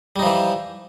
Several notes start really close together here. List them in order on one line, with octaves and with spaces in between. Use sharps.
G3 D#4 F3 E3